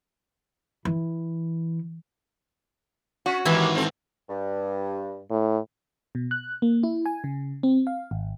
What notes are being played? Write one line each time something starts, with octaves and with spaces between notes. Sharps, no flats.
E3
C#4 F#4
D#2 G#2 D#3 E3 A#3 E4
C4 A4
G2
A2
B2
F#6
A#3
E4
G#5
C#3
C4
F5
G#1